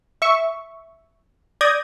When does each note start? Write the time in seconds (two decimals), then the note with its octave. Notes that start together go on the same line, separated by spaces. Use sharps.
0.22 E5 C#6
1.61 D5 D#6 G6 G#6 A#6